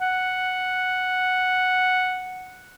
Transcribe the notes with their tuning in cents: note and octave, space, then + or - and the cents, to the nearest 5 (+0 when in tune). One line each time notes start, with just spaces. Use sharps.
F#5 +0